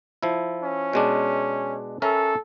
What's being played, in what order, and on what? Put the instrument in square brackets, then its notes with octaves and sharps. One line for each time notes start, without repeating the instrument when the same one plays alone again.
[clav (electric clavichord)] F3 E4
[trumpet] C#4
[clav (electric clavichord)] B2 G#3 D4
[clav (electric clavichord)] C#4 A#4 E5 [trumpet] A4